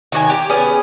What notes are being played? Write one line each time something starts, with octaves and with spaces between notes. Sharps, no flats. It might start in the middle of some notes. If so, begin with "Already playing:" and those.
D#3 F#3 D5 G#5
G4
B3 C#4 G#4